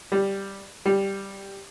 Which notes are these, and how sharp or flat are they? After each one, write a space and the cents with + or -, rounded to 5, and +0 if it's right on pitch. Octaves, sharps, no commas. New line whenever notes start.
G3 +0
G3 +0